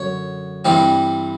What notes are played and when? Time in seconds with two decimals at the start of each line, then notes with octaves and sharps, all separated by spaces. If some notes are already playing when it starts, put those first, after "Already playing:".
Already playing: F#2 D3 C#5
0.65 G2 E3 G3 C4